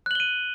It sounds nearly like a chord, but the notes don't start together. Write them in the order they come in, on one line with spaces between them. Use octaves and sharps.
F#6 F#7 G7 D#7